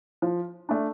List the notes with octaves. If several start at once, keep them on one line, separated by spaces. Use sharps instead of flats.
F3
A3 D4